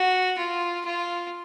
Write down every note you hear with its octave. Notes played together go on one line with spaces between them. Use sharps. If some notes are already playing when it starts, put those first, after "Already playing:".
Already playing: F#4
F4
F4